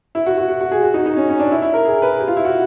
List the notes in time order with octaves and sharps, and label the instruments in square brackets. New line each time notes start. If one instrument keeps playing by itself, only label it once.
[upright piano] E4
F#4
F#4
F#4
F#4
G#4
F#4
D#4
D#4
C#4
C#4
D4
E4
E4
A#4
G#4
B4
G4
F4
E4
F#4